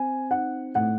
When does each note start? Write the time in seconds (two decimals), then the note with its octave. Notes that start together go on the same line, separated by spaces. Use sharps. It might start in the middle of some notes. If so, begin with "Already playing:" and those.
Already playing: C4 G#5
0.30 D#4 F#5
0.75 A2 F#5